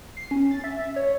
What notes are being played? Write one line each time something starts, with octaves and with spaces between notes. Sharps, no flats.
C7
C#4
A6
E5
C#5